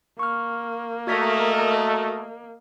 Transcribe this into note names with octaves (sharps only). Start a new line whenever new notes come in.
A#3 C#6 F6
A3 F#4 A#4 D#5 A#5 G#6 B6